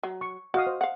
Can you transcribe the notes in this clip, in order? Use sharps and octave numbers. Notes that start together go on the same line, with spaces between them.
F#3
C#6
F#4 D#5 F5 D#6
C5
F5 F#5